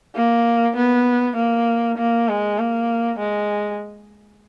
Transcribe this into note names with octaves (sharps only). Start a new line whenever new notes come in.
A#3
B3
A#3
A#3
G#3
A#3
G#3